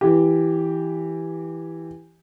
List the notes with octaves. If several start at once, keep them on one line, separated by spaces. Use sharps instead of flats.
E3 G4